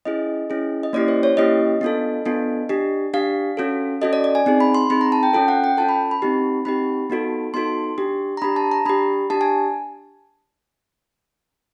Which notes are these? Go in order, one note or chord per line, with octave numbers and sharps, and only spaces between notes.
C#4 E4 G#4 D#5
C#4 E4 G#4
D#5
A#3 C#4 E4 G4 D5
C5
C#5
A#3 C#4 E4 G4 D#5
B3 D4 F4 A4
B3 D4 F4 A4
D4 G4
D4 G4 F5
C#4 F#4 A4
C#4 F#4 A4 D#5
D5
D5
G#5
C4 D#4 G#4
B5
C6
C4 D#4 G#4 B5
A#5
A5
G5
C#4 F4 A4 G5
F#5
G5
C#4 F4 A4 A5
B5
B5
C4 D#4 G4
C4 D#4 G4 B5
B3 D#4 F#4 A4
B3 D#4 F#4 A4 C6
D4 G4
A#5
D4 G4 B5
A5
A#5
D4 G4 B5
D4 G4 A5
G#5